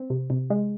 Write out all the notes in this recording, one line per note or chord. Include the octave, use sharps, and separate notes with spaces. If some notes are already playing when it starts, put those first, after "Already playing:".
Already playing: C4
C3
C3
G#3